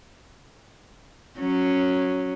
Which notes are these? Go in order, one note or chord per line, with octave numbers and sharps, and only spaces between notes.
F#3 C#4